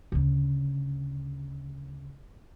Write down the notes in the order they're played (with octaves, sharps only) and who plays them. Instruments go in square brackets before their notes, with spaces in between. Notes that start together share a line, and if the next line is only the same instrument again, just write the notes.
[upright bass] D2 C#3